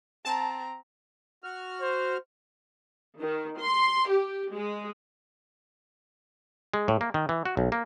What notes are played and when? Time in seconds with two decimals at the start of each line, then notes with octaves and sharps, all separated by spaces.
0.25 C4 A5 A#5
1.44 F#4 F6
1.81 C5
3.19 D#3
3.59 C6
4.08 G4
4.54 G#3
6.74 G#3
6.88 A2
7.01 A#3
7.14 D#3
7.29 E3
7.45 F#4
7.57 B1
7.72 A#3